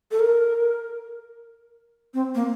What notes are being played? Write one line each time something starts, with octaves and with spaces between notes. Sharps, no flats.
A4
A#4
C4
A#3